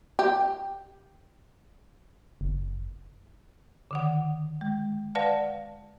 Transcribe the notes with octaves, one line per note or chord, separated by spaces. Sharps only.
G4
F#1
D3 D#3 F#5
G#3
B4 D5 F5 F#5 A5